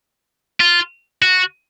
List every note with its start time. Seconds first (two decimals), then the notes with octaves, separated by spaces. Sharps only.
0.60 F4
1.22 F#4